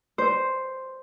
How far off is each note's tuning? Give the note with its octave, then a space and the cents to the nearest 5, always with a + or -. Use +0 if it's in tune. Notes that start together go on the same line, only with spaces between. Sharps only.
C5 +0